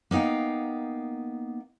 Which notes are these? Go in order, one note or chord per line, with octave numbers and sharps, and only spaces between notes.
A#3 B3 D#4 F5 G5